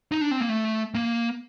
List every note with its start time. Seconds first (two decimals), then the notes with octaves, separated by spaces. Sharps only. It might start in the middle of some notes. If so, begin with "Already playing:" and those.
0.12 D#4
0.21 D4
0.31 C4
0.41 A#3
0.49 A3
0.95 A#3